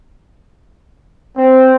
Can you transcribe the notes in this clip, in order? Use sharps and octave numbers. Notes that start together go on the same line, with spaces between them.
C4